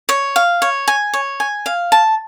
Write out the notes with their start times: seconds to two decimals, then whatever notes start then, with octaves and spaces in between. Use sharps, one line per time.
0.09 C#5
0.36 F5
0.62 C#5
0.88 G#5
1.13 C#5
1.40 G#5
1.66 F5
1.92 A5